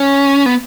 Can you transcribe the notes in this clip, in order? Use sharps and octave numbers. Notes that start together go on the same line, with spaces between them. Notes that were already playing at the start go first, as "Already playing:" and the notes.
Already playing: C#4
B3